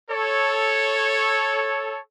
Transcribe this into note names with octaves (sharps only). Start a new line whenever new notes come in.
A4 C#5